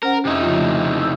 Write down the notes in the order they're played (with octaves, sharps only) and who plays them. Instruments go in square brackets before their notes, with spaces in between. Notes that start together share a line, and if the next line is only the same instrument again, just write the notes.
[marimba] C#4 C5 F#5 [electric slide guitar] A#4
[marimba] F2 [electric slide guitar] C3 D#4 E4
[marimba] C#3 F3 F4
D#3 A3
E6 G6